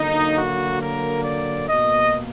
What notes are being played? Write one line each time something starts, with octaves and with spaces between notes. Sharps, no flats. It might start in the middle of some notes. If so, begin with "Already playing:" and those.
Already playing: D3 F#3 A#3 D#4
F#4
A#4
D5
B2 A#3 D#5